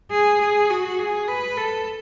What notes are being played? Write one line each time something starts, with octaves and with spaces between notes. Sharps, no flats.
G#4
G#4
F#4
G#4
B4
A4